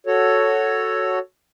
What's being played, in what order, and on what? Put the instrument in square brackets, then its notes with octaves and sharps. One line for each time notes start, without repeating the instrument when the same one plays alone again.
[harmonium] F#4 A4 C#5